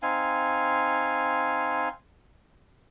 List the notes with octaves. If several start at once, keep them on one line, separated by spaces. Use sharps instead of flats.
C4 D#4 F5 G#5